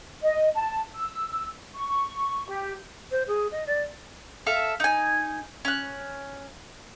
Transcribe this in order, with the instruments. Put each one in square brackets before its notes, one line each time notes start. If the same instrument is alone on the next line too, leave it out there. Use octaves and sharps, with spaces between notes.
[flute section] D#5
A5
E6
C#6
G4
[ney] C5
G#4
D#5
D5
[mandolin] A4 E5 F5
D#4 G#5
C#4 F#6